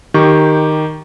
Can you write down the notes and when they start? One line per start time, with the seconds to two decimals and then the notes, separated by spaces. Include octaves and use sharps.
0.14 D#3 G4 C#6